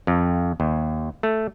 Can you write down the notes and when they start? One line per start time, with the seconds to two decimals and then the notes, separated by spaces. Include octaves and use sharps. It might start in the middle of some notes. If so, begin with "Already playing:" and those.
0.07 F2
0.60 D#2
1.23 A3